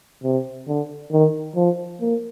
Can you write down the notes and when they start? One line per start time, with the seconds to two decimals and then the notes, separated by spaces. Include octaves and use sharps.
0.24 C3
0.68 D3
1.12 D#3
1.56 F3
2.01 A#3